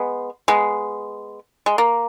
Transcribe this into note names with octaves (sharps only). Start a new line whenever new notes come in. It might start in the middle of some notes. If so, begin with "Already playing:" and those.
Already playing: G#3 B3
G#3 B3
G#3
A#3